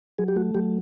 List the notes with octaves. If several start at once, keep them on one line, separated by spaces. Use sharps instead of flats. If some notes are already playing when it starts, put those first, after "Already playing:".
F#3 G#4
G4
A3 F#4
F#3 G4